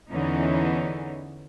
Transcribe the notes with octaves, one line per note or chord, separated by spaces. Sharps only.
E2 D3 E3 C#4 D#4